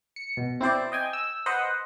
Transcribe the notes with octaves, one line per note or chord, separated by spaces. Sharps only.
C#7
B2
C4 E4 C5 D5
D#5 G5 G#5
E6
B4 C5 D#5 F#5